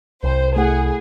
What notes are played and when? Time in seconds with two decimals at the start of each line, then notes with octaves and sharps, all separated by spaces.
0.24 C2 C5
0.56 A3 E4 G#4 F#5